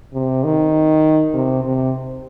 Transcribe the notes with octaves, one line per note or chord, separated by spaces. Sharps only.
C3
D#3
C3
C3